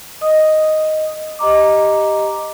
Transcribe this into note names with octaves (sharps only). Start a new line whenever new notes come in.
D#5 D#6
G4 D#5 A#5 D6